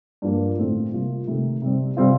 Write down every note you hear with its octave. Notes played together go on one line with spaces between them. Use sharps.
G2 F3 A#3
A2 A3 C4 F4
C3 G3 A#3 F4
C3 D#3 A3
C3 G3 C4
C3 G3 C4 F4